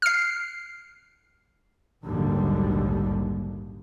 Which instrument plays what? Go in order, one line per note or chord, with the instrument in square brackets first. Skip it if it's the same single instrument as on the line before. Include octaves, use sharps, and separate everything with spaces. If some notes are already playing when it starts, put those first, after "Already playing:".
[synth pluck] F6 C7
[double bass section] A#1 D#2 G#2 D3 F#3 G3